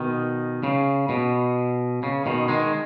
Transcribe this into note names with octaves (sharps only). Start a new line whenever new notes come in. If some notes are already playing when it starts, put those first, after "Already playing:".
Already playing: B2 D#3
C#3
B2
C#3
B2 D#3
D#3 G#3